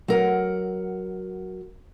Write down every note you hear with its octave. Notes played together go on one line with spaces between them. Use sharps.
F#3 A#4 F#5